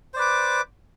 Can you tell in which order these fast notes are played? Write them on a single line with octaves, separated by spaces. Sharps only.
C5 D5 B4 D6